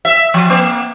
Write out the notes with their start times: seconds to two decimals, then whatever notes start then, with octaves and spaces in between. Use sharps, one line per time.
0.05 E5
0.34 F3
0.50 A#3